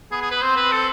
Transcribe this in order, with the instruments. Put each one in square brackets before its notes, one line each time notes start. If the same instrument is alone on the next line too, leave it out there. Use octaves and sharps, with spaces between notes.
[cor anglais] B3 [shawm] G#4
[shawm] G#4
B4
[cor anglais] C4 [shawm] C5
[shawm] B4
A4